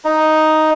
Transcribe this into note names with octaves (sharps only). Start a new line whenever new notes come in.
D#4